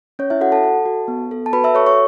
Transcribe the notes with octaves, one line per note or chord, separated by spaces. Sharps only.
C#4 C#5
E4 E5
F#4 A4 F#5
A4 A5
A4
F#4
B3
A4
A5
F#4 B4 B5
E5 E6
A4 C#5 C#6
C#5 C#6